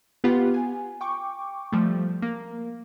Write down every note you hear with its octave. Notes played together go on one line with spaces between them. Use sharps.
B3 F4 G4 B4 F#5
G#5
G5 C#6 D6
F3 G3 A3
A#3